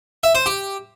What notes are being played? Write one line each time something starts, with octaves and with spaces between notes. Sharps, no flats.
E5
C5
G4